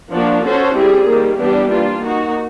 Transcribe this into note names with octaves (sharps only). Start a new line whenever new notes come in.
F3 A#3 D4 F#4
C#4 F#4 A4 C5
G3 C4 E4 G#4
D#3 G3 A#3
E3 G3 B3 D4 G4
A#3 D4 F4
A#3 D#4 F#4